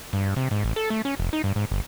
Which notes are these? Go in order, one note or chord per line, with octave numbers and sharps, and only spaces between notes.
G2
C3
G#2
A1
A4
A3
C#4
F1
D#4
G2
G#2
G1